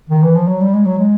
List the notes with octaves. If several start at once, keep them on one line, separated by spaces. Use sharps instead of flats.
D#3
E3
F3
F#3
G3
G#3
F#3
G#3